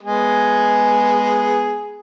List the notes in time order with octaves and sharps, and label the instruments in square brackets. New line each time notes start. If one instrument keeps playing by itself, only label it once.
[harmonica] G#3 B3 G#4